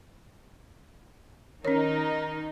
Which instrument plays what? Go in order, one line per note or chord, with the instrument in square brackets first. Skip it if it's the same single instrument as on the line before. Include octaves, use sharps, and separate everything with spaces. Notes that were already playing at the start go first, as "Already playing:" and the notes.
[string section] D#3 D#4 [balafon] C#4 C#5 [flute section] A#4